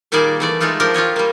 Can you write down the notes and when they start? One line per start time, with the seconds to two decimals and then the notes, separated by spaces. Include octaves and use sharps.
0.12 A#2 D#3 G3 A#3 G#4 D5
0.40 E3 A3 D5
0.60 G#3 A3 D#4 F4 A4
0.80 F3 D4 G4 A#4
0.94 F4 G4 C#5 D#5
1.16 G3 A#3